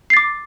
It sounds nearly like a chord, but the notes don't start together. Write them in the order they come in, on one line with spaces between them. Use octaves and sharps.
C7 A6 D6